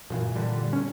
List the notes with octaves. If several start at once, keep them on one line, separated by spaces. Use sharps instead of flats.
F#2 A#2 E3
A#2 D3 G3
C#4